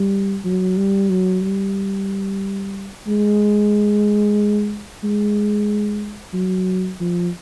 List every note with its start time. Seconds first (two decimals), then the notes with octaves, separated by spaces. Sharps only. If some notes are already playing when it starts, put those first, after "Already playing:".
Already playing: G3
0.44 F#3
0.77 G3
1.10 F#3
1.43 G3
3.07 G#3
5.04 G#3
6.34 F#3
7.00 F3